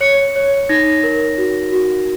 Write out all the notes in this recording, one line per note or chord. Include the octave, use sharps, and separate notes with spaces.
C#5 C#7
C#5
D#4 A#6
A#4
F#4
F#4